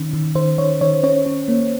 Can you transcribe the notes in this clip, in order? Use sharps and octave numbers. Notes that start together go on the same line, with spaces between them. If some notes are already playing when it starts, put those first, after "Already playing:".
Already playing: D#3 C#4
D#3
D#3 C5
D#3 C#5
D#3 C#5
C#4 C#5
C#4
A#3